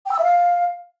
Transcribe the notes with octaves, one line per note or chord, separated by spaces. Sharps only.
G5
E6
E5
F5